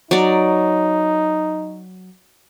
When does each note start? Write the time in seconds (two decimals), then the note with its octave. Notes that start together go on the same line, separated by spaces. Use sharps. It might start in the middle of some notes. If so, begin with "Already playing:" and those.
0.11 F#3 D#4 D5